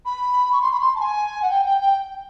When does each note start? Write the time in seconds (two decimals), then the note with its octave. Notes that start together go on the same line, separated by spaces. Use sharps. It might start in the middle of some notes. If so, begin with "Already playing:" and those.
0.06 B5
0.53 C#6
0.61 C6
0.71 B5
0.80 C6
0.95 A5
1.00 G#5
1.42 F#5
1.50 G5
1.65 G5
1.81 G5